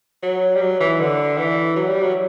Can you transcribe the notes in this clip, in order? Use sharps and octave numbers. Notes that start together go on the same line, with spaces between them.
F#3
G3
F#3
E3
D3
E3
F#3
G3
F#3